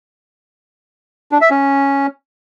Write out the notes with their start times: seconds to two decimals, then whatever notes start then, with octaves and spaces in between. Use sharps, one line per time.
1.32 D4
1.41 E5
1.51 C#4